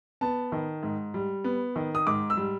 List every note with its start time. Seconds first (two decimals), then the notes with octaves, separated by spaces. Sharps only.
0.21 B3 A5
0.52 D#3
0.83 G#2
1.14 G3
1.44 B3
1.76 D#3
1.95 D#6
2.07 G#2 D6
2.30 E6
2.37 G3